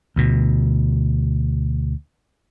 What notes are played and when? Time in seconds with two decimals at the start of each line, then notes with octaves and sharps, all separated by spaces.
0.16 D2 B2